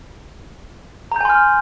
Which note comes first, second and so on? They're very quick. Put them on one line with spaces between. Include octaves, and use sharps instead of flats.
A#5 G6 G#5 C6 F6